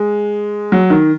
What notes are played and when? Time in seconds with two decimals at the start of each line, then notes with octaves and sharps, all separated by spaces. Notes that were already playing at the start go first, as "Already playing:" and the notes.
Already playing: G#3
0.72 F#3
0.90 D#3